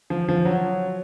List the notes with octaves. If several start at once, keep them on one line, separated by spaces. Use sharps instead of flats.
F3
F3
F#3